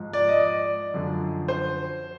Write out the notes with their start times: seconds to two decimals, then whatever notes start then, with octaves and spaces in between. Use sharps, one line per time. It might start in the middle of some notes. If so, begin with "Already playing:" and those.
Already playing: G#2 F3
0.13 D5
0.28 D#5
0.40 D5
0.94 F#2 D3 F3
1.48 C5